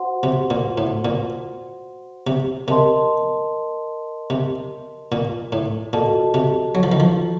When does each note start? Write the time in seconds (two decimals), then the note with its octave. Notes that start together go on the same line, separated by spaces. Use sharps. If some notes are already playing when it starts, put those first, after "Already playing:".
Already playing: F#4 C5 F#5 C6
0.23 C3
0.50 A#2
0.78 A2
1.05 A#2
2.27 C3
2.67 C3 A#4 D#5 A5 C6
4.30 C3
5.12 A#2
5.52 A2
5.93 A#2 F#4 A4 D#5 A5
6.34 C3
6.75 F#3
6.83 F3
6.92 D#3
7.00 F3